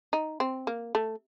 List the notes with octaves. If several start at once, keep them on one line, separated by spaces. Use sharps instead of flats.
D#4
C4
A#3
A3